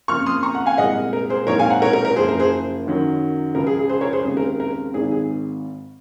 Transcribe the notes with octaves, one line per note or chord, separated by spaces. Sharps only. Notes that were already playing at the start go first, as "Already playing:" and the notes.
F2 C#3 F3 A#3 C#6 F6
C6 D#6
A#5 C#6
F#5 A#5
F5 G#5
C2 A#2 G#3 D#5 F#5
A#4
G#4 C5
A#1 G#2 F#3 C4 A#4 C#5
F5 G#5
F#5 A#5
A#4 C#5
A#4
A#4
F#1 F#2 F3 G#4 C5
A#4
G#4 C5
F#2 D#3 F#3
C#2 C#3 F3 A#4
G#4
G#4
G#4 C5
A#4 C#5
G#4 C5
D#2 C#3 G#3 C4 G#4
A#4
A#4
G#1 G#2 D#3 G#4
G#4